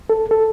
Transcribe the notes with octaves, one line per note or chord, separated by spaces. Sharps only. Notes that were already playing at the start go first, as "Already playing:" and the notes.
A4
A4